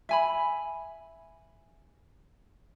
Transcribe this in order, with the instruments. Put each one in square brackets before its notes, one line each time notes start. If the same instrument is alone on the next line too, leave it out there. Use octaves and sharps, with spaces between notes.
[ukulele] E5 G#5 B5